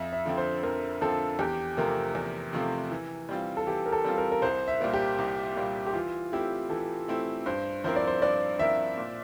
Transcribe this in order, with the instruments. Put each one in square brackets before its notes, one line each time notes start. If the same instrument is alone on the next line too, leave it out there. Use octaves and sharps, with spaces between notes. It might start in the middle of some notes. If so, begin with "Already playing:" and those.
Already playing: [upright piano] F2 [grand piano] E5
[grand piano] E5
[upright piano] D3 F3 C4
[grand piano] C5
[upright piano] F2 [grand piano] A#4
[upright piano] D3 F3 C4 [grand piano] A4
[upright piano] E2 [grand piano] G4
[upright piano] C3 F3 A3 C4 [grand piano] A#4
[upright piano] E2 [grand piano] A#4
[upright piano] C3 F3 A3 C4
E3
G3 C4 F4
[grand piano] A4
[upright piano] E3 [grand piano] G4
[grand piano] A#4
A4
[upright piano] G3 C4 F4
[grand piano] A#4
A#4
[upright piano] C2 [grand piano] C5
[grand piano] E5
[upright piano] A#2 G3 A#3
[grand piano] G4
[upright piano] C2
A#2 G3 A#3
[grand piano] G4
[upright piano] E3 [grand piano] F4
[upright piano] A3 C4 E4 [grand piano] G4
[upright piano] E3 [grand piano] A4
[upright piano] A3 C4 E4
[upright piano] G2 [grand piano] C5
[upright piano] F3 C4 E4 A#4 [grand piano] C5
[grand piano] D5
C5
[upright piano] G2 [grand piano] D5
[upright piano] F3 C4 E4 A#4 [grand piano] E5
[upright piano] A#2